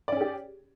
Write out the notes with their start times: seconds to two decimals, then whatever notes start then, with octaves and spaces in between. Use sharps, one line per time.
0.08 D5
0.12 C#4
0.17 G#4
0.21 G4